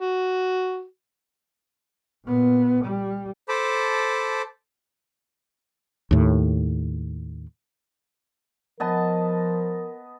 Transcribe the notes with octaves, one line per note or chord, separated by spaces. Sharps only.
F#4
A#2 B3
G3
A4 C5 A5 B5 D6
D#2 A2
F3 B3 A#4 D#5 A5